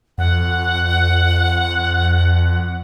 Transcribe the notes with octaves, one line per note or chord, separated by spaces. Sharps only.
F2 F#5